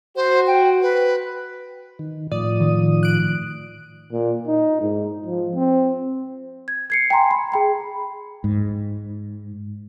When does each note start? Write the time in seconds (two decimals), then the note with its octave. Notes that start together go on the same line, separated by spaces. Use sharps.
0.16 F#4 C5
0.47 G5
0.82 B4
1.99 D#3
2.32 A2 F3 D5 D#6
2.60 D#3
3.03 F#6 D7
4.12 A#2
4.47 D#4
4.81 G#2
5.26 F3
5.55 C4
6.68 G#6
6.90 G#6 C7 C#7
7.10 G5 G#5 A#5 C6
7.31 B5
7.52 G#4 G5 B5
8.44 G#2